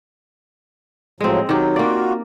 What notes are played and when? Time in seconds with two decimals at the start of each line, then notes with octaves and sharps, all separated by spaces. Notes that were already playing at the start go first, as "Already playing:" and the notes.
1.20 A2 F3 F#3 G#3 C4
1.49 D#3 F#3 G4
1.76 A#3 F4 F#4 D5